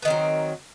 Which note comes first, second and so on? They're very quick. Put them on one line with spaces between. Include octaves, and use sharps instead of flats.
B3 D#3 C4 F#3